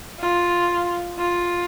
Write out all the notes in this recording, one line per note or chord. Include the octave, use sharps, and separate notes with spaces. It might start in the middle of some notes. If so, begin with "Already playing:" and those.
F4
F4